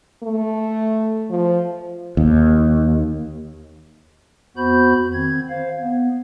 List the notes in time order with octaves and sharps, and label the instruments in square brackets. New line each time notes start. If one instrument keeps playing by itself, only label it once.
[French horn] A3
F3
[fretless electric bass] D#2
[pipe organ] F2 B3 F#4 C5 B5 G6
D#3 C4 G#6
C5 F5
B3